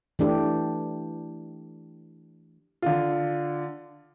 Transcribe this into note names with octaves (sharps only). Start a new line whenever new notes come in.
E3 A3 D4 G4
D3 F4